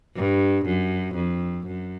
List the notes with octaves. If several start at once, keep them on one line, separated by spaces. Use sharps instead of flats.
G2
F#2
F2
F#2